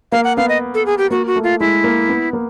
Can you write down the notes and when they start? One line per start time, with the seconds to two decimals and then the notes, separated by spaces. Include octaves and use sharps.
0.12 A#3 F5
0.24 F#5
0.37 B3 F5
0.49 D#5
0.74 A4
0.86 G#4
0.98 G4
1.11 A#3 F#4
1.27 F#4
1.36 A3
1.43 F4
1.60 G#3 E4
1.84 A#3
2.09 B3
2.33 A#3